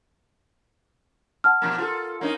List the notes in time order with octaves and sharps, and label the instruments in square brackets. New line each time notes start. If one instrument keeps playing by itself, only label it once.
[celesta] F#5 A5 F6
[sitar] B2 F3 A#3
F4 G4 A4
A#3 C#4 D#4